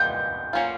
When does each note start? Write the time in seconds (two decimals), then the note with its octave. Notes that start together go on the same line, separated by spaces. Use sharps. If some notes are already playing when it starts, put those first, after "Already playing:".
Already playing: G#3 B3 D#4 G4 G6
0.53 F#3 A#3 C#4 F4